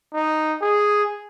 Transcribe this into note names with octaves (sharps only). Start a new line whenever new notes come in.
D#4
G#4